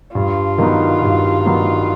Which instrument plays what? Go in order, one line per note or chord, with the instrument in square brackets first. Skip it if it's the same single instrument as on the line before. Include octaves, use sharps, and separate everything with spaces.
[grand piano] G2 [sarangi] F4
[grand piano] D#3 F#3 B3
G2
D#3 F#3 B3